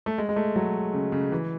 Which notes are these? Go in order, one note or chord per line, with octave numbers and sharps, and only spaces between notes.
A3
G#3
G#3
A3
F#3
C#3
C#3
E3